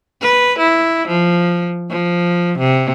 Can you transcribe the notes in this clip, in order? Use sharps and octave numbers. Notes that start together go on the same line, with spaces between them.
B4
E4
F3
F3
C3